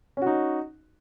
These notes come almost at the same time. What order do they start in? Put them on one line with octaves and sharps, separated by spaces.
C#4 F#4 D#4